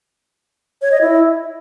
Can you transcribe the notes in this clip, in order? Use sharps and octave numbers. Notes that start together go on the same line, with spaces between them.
C#5
D#5
E4